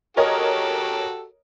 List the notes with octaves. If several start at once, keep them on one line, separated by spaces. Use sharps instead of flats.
F#4 G4 A4 A#4 C#5 D#5